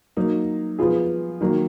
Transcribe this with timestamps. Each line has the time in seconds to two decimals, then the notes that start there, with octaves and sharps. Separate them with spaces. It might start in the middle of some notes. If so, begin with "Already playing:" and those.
0.17 F#3 A#3 D#4
0.79 F3 B3 F4 G#4
1.41 D#3 F#3 A#3